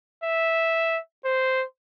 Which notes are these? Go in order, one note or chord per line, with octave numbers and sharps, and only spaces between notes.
E5
C5